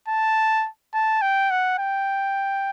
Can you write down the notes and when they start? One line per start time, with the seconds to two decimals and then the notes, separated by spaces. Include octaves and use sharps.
0.08 A5
0.94 A5
1.21 G5
1.50 F#5
1.79 G5